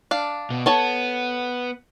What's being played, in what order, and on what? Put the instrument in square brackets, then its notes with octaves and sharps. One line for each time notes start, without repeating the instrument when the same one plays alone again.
[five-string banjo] D4 F5
[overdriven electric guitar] B2
[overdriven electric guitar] B3 [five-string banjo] A4 C#5 A5